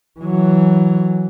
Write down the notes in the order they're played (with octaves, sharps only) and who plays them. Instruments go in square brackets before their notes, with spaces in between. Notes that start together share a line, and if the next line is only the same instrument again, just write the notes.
[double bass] E3 F#3